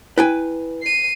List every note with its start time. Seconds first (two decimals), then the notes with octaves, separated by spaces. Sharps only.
0.18 E4 B4 G5 G#5
0.82 C7 D#7